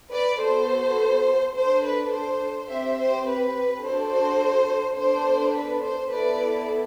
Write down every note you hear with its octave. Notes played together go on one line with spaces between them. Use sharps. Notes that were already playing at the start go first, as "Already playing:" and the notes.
B4 D5
B3 F#4 A4 C5
D4 A4 C5
B4
C5
C4 G4 C5 E5
C5
B4
D4 F#4 A4 C5
C5
B3 D4 A4 C5
B4
C5
B3 E4 A4 B4 D5